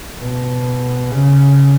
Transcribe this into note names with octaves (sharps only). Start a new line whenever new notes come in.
B2
C#3